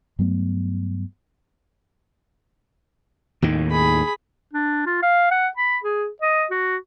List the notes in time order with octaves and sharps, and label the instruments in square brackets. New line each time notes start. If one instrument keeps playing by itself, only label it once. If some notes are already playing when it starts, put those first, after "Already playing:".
[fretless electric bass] G2 F#3 A3 B3
[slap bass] D#2 A2 D#3
[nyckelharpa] G#4 B5
[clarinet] D4
F4
F5
F#5
B5
G#4
D#5
F#4